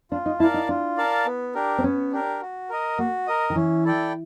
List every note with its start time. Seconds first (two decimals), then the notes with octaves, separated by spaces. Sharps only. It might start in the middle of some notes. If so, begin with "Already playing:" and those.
0.11 D4 F4
0.26 D#4
0.40 E4 A#4 D5 F5 A5
0.54 D#4
0.69 D4 F4
0.97 A#4 D5 F5 A5
1.26 B3
1.55 D4 G4 A#4
1.78 C4
1.84 B3 C#4
2.12 D4 G4 A#4
2.41 F#4
2.70 A#4 D#5
2.98 A#3 F#4
3.27 A#4 D#5
3.50 D#3
3.55 E3 C#4
3.85 E4 A4 D5 G5